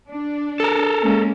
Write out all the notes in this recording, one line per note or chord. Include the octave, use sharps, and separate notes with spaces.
D4
A4 A#4
G#3 A#3 C#4